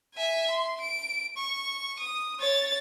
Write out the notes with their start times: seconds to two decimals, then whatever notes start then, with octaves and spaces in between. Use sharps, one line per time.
0.15 E5 G#5
0.51 C6
0.81 D7
1.37 C#6
1.99 D#6
2.39 C#5 A6